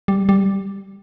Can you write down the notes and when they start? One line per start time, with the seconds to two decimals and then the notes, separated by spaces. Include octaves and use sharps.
0.08 G3
0.29 G3